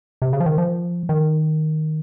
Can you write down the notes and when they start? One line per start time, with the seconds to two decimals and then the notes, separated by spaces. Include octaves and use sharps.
0.22 C3
0.33 C#3
0.40 F3
0.46 D#3
0.58 F3
1.09 D#3